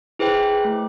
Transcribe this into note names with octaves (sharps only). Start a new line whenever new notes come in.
E4 G#4 B4 C5 G5
A3